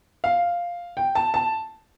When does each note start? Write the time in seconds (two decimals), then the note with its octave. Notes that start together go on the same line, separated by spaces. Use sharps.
0.24 F5
0.97 G5
1.15 A5
1.34 A5